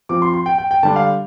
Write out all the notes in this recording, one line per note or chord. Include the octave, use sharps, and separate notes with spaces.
F3 C4 D6
C6
C6
G5
G5
G5
D3 G3 D4 A5
F5